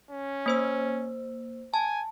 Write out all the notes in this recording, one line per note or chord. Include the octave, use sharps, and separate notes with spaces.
C#4
A#3 C5 E6
G#5 A5